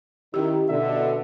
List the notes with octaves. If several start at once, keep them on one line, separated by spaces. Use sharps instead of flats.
D#3 C#4 E4 G4
B2 D3 E5